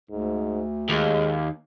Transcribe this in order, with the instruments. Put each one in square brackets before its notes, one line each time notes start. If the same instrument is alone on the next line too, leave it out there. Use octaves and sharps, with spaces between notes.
[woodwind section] D2 [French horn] G#2
[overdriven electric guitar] D#2 [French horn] G#3